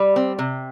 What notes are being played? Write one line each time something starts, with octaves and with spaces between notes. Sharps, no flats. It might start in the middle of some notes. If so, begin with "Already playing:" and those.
Already playing: G3
C4
C3